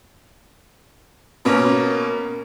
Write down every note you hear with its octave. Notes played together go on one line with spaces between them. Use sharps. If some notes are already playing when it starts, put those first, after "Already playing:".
B2 A#3 C#4